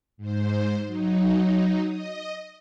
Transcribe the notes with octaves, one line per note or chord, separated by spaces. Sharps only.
G#2 C5
F#3 D#4
D#5